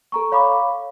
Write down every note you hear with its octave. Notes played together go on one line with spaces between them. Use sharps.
A4 A#5 C#6
C#5 F5 B5 C#6 D6